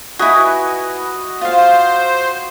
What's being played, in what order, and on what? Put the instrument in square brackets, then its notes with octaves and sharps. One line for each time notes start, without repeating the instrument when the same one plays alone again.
[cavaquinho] E4 B4 G#5 [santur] F#4 D#5
[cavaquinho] F4 F5 [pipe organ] C5